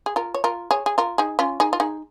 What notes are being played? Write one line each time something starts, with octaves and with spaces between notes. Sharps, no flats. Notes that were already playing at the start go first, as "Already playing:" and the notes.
G#4
F4 A#4
C#5
F4 A#4
G#4 C#5
G#4
F4 A#4
D#4 G#4
C#4 F4
D#4 G#4
F4
D#4 G#4